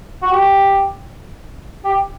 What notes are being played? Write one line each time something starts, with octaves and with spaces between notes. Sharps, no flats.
F#4
G4
G4